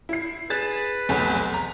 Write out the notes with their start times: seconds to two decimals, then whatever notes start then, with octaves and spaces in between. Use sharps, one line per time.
0.09 E4 C7
0.50 G#4 B4 A6 E7
1.09 F1 B1 E2
1.54 A#5